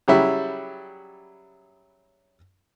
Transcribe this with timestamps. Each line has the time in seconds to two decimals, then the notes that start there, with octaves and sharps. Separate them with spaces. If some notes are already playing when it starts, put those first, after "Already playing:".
0.08 C#3 F#3 G3 E4